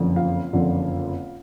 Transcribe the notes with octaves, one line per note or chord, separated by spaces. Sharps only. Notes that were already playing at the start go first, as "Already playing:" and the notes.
Already playing: F#1 F2 D3 F3
F4 F5
F#1 F2 D3 F3